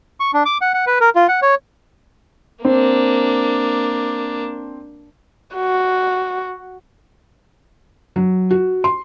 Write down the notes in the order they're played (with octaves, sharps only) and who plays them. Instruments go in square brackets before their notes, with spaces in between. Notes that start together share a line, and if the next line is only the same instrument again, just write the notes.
[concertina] C#6
D4
D6
F#5
F#5
B4
A#4
F4
F#5
C#5
[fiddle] A#3 D4 [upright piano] C4
[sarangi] F#4
[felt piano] F#3
F#4
C6